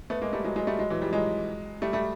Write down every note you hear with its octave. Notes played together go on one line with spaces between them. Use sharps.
A3 B3
G#3 A#3
G3 A3
F#3 G#3
F#3 G#3
G3 A3
F#3 G#3
E3 F#3
F3 G3
F#3 G#3
G3 A3
G3 A3